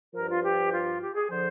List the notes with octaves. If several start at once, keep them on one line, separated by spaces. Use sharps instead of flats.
G2 F3 A#4
F4
G4
F4
G4
G#4
D3 F3 C5